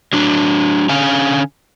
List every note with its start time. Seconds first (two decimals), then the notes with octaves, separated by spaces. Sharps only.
0.13 F#3 D4
0.89 D3 C#4 F5 G#5